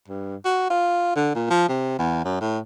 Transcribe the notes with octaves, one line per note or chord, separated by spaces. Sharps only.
G2
F#4
F4
D3
A#2
F3
C3
E2
F#2
A2